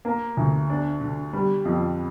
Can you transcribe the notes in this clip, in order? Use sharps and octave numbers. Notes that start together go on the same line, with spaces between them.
A#3
D2
D4
D3
G3
F2